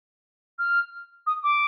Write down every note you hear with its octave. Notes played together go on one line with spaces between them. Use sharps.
F6
D#6
D6